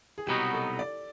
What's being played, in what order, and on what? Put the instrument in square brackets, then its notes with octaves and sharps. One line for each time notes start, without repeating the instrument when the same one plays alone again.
[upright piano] G#4
[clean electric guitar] C2 B2 F#3 B3 D#4 [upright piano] G4
[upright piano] A4
D5